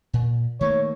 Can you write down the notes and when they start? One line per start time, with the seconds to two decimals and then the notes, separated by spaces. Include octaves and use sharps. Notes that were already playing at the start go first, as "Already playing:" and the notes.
0.13 A#2
0.61 D#3 A3 A#3 C#5